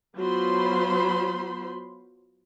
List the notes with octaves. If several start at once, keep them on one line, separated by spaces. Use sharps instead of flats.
F#3 B3 F4 C5 B5 C6